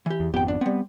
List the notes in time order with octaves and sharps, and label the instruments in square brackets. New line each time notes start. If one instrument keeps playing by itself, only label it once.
[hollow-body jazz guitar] E3 G4
[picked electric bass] E2
[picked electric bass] G#1 F2 B3 [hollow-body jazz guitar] G4 G5
[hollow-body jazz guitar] D4
[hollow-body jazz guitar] G3 C4 [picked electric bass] B3